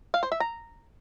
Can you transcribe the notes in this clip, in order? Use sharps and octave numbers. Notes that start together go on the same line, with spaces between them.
F5
C5
E5
A#5